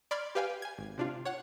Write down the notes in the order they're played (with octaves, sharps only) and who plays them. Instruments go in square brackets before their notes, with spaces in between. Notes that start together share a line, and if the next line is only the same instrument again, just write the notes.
[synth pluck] D5 B5 C6 F6 G#6
G4 B4 F5 G5 G#5
G#5 G#6
G#1
C3 D4 F4
C#5 F#5 F#6